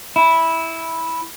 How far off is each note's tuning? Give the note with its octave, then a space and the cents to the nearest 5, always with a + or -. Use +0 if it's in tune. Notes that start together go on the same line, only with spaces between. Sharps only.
E4 -10